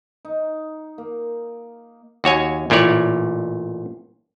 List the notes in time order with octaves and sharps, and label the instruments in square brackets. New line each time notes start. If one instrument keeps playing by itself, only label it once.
[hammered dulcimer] D#4
A#3
[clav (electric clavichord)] D#2 F#4 C#5 G#5
A1 A#2 E4 C#5 D5